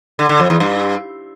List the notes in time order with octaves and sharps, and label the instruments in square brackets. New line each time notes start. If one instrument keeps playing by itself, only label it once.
[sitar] D3
D3
F2
E2
G2